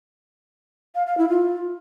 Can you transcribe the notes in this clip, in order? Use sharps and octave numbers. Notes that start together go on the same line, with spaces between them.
F5
F5
E4
F4